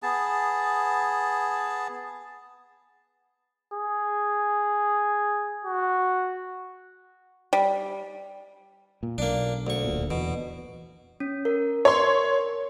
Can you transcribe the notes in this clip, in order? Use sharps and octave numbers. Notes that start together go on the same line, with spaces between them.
B3 G#4 A5
G#4
F#4
G3
A#2
B1 A#3 D4
D2 C#6
D1 A#2
E2 B2
C#4
A#4
C#5 C6